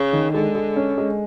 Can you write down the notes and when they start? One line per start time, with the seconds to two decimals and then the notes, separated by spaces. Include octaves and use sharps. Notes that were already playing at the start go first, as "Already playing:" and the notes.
Already playing: C#3
0.13 D#3
0.34 D3 G#3
0.55 G#3
0.76 C#4
0.98 G#3